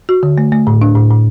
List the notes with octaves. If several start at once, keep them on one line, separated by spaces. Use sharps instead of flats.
F#4
D3
A3
A3
A2
D4
A2
A2